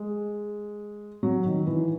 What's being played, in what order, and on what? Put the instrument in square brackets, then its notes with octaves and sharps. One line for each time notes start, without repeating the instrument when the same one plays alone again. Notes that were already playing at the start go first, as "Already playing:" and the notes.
Already playing: [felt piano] G#3
F#3
D#3
E3